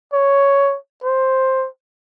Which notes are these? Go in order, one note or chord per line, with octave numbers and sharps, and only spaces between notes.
C#5
C5